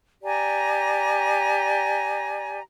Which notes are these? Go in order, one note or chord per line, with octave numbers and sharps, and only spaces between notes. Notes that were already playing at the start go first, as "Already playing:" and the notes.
G4 D5 G#5 A#5